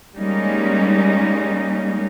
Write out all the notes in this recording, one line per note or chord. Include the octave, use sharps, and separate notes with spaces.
G3 G#3 A#3 C#4 D#4